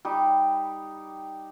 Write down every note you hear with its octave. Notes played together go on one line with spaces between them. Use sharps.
G3 D#4 G4